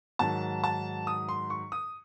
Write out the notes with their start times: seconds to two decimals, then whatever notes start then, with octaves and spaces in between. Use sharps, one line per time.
0.19 G#2 D#3 F#3 A5
0.64 A5
1.07 D#6
1.28 C6
1.50 C#6
1.72 D#6